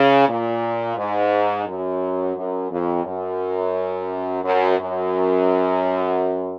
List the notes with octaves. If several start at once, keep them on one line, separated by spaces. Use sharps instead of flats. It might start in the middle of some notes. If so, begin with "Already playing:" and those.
Already playing: C#3
A#2
G#2
F#2
F#2
F2
F#2
F#2
F#2